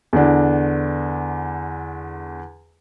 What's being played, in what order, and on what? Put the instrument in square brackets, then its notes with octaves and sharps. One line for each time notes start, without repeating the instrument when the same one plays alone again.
[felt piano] E2 D3 D4